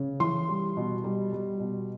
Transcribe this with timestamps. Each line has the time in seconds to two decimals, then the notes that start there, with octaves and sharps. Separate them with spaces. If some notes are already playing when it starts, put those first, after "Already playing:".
Already playing: C#3
0.20 E3 C6
0.49 G3
0.77 B2
1.04 G3
1.33 G3
1.60 B2